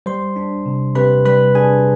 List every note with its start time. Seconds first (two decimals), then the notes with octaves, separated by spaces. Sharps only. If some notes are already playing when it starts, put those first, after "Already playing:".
0.06 G3 C5 C6
0.36 D4
0.66 C3
0.95 C3 B4 B5
1.25 G3 B4 B5
1.55 D4 G#4 G#5